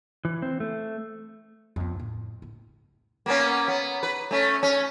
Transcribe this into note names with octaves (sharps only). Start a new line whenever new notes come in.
E3
C4
A3
F2 B3
A2
A2
A#3 B3 C#4
B3
B4
A3 C#4
C#4